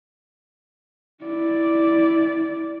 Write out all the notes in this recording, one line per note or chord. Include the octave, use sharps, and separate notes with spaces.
E4 D5